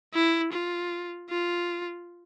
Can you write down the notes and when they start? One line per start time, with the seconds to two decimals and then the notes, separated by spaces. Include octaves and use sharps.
0.14 E4
0.53 F4
1.30 F4